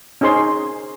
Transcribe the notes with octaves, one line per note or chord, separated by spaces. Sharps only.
C#4 D#4 G#4 C5 C6